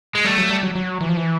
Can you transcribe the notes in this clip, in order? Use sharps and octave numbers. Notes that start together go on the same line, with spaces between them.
G#3
G3 A3
F#3
G3
F#3
F#3
E3
F3
E3